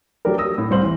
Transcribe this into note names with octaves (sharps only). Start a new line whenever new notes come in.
F#3 A3 D4 G4 A#4
D#6 E6 A#6
A2
C2 C5 F#7
E3